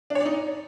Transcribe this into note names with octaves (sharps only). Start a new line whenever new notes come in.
D4
C#5
D5
D#4